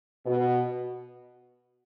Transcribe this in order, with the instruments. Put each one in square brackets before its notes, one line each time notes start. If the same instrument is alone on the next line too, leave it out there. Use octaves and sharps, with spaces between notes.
[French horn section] B2